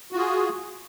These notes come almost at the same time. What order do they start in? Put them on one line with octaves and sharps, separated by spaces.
F#4 F4 G#4